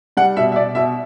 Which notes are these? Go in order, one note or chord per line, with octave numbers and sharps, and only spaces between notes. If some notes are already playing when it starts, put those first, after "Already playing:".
G3 F#5
B2 E5
E5
B2 D5
B2 E5